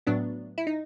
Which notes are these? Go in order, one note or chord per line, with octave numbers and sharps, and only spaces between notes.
A2 F#3 B3 D4
E4
D#4